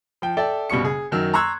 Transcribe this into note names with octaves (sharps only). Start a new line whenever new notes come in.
F3 G5
A4 D5 E5 G5
F#1 B2 G3 C#6 C#7
G#4
F#2 D#3 F#3 E6
A#5 C6 C#6 E6 F#6 G#6